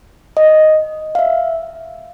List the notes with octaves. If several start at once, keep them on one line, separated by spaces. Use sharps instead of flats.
D#5
F5
E5